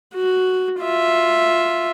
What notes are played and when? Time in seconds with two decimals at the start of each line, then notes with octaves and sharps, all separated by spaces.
0.15 F#4
0.80 F4 E5